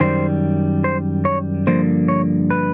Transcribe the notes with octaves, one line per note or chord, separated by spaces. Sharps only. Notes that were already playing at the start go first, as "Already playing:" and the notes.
F#2 D#3 G3 C5
C5
C#5
G2 D3 F3 A#3 C5
C#5
B4